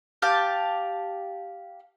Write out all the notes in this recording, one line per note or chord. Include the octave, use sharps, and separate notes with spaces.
G4 F5 A5